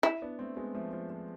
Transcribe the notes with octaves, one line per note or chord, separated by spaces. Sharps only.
E4
B3 D4
A3 C4
G#3 B3
F3 A3
F3
F3